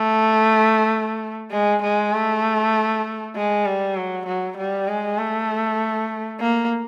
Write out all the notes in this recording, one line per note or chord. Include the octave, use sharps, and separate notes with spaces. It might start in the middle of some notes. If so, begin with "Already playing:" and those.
Already playing: A3
G#3
G#3
A3
G#3
G3
F#3
F#3
G3
G#3
A3
A#3